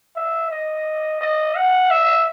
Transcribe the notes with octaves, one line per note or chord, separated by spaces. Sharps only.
E5
D#5
D#5
F#5
E5